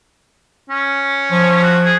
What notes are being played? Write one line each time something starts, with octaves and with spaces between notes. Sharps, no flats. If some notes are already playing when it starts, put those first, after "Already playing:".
C#4
F3
F#4
G#4